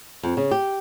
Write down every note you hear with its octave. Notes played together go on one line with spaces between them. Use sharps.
F2
C#3
G4